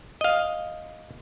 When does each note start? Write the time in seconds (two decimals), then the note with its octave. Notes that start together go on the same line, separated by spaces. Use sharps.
0.21 D#5 F5